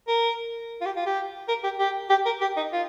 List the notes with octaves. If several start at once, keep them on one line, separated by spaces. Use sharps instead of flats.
A#4
F4
G4
F4
G4
A#4
G4
G4
G4
A#4
G4
D#4
F4